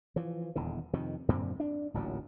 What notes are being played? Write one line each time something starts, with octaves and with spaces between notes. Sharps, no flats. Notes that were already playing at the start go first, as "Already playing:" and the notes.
E3 F3
D#1 E2 D3
F2 C3 D#3
F#2 A#2 D3 C4
D4
D1 A1 A#2 F#3